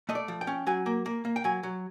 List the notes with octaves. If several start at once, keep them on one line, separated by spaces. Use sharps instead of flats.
A3 D#5
D5
F3
G5
C#4
F#3 G#5
A#3
A#3
A#3
G5
F#3 G#5
F#3